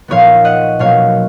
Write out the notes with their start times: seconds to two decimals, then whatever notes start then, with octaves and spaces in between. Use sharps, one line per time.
0.08 A#2 F3 B3 D#4 C#5 F5
0.45 D#5 F#5
0.79 B2 F#3 A#3 C#4 C#5 F5